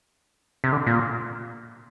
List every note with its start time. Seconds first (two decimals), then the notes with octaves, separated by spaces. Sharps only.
0.64 C3
0.72 D3
0.87 A#2